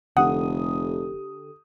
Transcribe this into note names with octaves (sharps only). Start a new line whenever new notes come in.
F1 D3 G4 A4 F#5 D#6